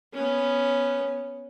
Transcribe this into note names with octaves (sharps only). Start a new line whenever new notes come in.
B3 C#4